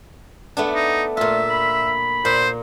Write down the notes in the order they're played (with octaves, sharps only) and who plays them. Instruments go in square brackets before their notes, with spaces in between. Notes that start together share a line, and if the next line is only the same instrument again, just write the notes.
[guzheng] A3 B3 D4
[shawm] D#4
[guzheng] A#2 F4 [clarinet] A3 [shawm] E5
[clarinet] B5
[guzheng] A#2 [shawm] C5